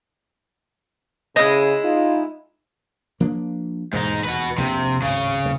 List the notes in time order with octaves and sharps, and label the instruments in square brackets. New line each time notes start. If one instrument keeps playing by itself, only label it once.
[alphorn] C#3 [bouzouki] G#3 E4 [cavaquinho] D#5
[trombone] D#4 [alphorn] F4
[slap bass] F3 A#3 D4
[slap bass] E1 D#2 [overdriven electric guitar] G#2 D#4
[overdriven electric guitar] F#4 B4
[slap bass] F1 A#1 D#2 [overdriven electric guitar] C3
[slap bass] D1 G#1 [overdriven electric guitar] C#3
[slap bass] D1 E2